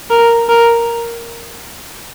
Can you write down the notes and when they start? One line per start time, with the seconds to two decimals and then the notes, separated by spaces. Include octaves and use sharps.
0.10 A#4
0.49 A#4